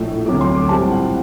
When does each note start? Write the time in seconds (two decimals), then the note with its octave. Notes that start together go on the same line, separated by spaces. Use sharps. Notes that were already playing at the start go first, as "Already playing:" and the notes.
Already playing: A#1 A2 A3
0.26 D2 C3 F#3 A3 D6
0.41 C6
0.55 D6
0.68 A#1 A2 G3 C4 A5
0.91 F#5